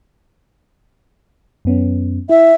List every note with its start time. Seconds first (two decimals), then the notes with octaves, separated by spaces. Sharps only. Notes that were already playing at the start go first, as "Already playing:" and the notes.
1.65 F#2 B3 C#4
2.29 E4 E5